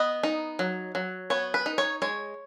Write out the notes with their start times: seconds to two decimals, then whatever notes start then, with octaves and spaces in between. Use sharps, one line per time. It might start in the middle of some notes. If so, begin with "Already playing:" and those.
Already playing: B3 D#5
0.23 D#4
0.59 F#3
0.95 F#3
1.30 B3 C#5
1.54 B4
1.66 D#4
1.78 C#5
2.02 G#3 C#5